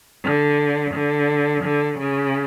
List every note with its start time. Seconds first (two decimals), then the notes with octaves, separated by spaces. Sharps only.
0.24 D3
0.94 D3
1.64 D3
1.99 C#3